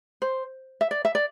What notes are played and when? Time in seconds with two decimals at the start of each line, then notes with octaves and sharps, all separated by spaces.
0.22 C5
0.81 E5
0.91 D5
1.05 E5
1.15 D5